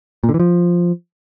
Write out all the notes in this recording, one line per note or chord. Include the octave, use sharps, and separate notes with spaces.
A#2
D3
E3
F3